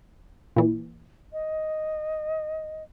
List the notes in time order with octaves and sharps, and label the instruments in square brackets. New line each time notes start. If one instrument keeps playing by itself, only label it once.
[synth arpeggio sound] A#2 E3
[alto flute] D#5